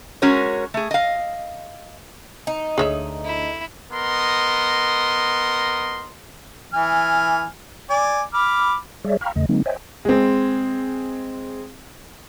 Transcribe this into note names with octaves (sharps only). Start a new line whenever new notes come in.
G#3 C#4 F#4 A#4 C#5
A3 G#4
D#5 F5
D#4
D2 G#4 C#5 E5 F#7
E4
B3 A#4 D#5 C6
E3 G#5 F6
D5 G#5
B5 D6 F6
G3 G#4 C#5 D5 E5
F5 G5 A#5 B5 C#6 F6
E2 C#3 A3 D#5
D3 F#3 G#3 A#3 C4 D#4
C5 C#5 D#5 E5 G5 G#5
G#3 C4